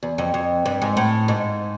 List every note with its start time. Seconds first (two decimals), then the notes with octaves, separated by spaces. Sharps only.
0.03 E2
0.18 F2
0.34 F2
0.66 G2
0.82 G#2
0.97 A2
1.28 G#2